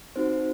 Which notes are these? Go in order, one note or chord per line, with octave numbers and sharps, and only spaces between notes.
C4 D#4 F#4 C5